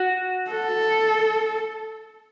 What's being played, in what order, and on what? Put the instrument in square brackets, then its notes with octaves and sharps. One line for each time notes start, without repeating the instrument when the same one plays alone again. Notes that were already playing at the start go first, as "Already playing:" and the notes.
Already playing: [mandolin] F#4
[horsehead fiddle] A4